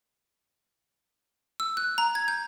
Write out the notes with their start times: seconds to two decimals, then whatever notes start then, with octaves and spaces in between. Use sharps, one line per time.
1.60 E6
1.77 F#6
1.98 A#5
2.15 G#6
2.28 G6